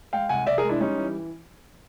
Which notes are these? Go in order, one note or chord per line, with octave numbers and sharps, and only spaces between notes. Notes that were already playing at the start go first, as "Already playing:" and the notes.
G#3 F5 G5
C2 F#5 G#5
C2 D5 E5
G#4 A#4
G#3
D4 E4
G3 C#4 D#4
E3